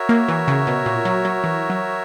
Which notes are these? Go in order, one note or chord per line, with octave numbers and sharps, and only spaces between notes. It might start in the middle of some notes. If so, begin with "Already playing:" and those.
Already playing: F#4 A#4 C#5 E5
A#3
E3
C#3
B2
A#2
F#3
F#3
E3
F#3